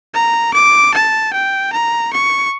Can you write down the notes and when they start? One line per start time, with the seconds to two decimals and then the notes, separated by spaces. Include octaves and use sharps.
0.14 A#5
0.54 D6
0.94 A5
1.33 G5
1.73 A#5
2.13 C#6